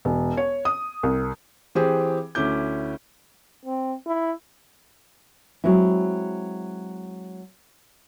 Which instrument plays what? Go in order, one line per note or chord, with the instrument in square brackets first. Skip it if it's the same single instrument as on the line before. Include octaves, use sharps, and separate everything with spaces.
[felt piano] E1
C#5
D#6
C2
E3 C4 G4 G#4
D2 C#4 E4 D6 G6
[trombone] C4
E4
[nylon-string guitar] F#3 G#3 C4 E4